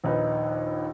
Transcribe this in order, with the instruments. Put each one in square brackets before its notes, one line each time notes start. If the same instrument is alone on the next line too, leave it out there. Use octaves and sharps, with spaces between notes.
[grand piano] A#1 D#2 D#4 B4